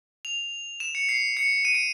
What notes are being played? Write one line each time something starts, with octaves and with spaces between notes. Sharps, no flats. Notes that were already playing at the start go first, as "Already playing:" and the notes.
F7
E7
C#7
C7
C#7
D#7
D7